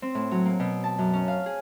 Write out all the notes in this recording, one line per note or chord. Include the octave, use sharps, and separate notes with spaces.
C4
A2
F#3
A#3
B2
A5
F#2
C#4
F5
G#4